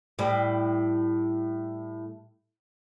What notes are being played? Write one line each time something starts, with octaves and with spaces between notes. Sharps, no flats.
A2 G3